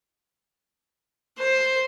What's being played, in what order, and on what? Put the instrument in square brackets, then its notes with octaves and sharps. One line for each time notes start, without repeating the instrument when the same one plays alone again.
[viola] C5